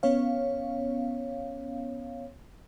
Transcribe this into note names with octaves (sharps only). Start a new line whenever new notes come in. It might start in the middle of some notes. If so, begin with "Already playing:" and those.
B3 C#4 C#5 F5